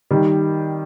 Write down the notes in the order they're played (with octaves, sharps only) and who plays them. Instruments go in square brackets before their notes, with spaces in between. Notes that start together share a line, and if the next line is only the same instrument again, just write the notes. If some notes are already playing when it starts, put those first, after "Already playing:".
[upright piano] D#3 G3